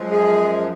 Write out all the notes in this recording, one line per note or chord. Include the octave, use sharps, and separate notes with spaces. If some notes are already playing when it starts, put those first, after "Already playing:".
Already playing: F#2 F3 G#3
G#4